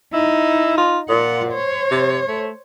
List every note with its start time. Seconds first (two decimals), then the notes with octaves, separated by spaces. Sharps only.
0.13 D#4 E4
0.77 F4
1.09 A#2 F4 F#5
1.49 C5 C#5
1.91 C3
2.28 A3